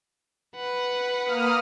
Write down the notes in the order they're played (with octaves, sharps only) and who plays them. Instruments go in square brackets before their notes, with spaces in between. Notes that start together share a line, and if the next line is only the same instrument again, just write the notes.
[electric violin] B4 F#5
[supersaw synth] A#3 D#6 F6